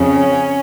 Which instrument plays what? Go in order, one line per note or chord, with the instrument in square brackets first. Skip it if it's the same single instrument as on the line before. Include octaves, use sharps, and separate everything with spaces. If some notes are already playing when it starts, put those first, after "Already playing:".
Already playing: [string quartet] F2 C#3 C#4